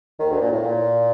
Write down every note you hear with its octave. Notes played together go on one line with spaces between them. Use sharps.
D#2 D#3
D2 D3
A#2
A2
A#2